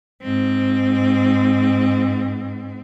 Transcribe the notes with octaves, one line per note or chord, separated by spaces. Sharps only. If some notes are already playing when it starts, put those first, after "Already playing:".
G#2 C4